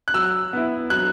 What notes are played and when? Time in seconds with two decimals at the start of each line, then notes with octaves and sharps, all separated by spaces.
0.08 F#6
0.14 F#3 E6
0.53 B3 E4
0.90 F#3 F#6